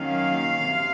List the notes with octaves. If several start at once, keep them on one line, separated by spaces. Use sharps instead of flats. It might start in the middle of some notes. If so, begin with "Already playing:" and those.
Already playing: D#3 F#3 A#3 C#4 F5
C3